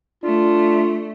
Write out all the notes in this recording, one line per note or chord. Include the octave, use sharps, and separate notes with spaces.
A3 D4 F4